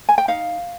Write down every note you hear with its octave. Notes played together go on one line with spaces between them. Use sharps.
G#5
G5
D#4 F5